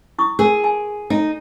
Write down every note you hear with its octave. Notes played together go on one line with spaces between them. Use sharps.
E4 C#6 D#6
G#4 A#4
G#5
D#4 A4